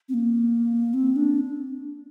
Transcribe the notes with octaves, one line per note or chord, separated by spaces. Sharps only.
C4
A#3
C4
D4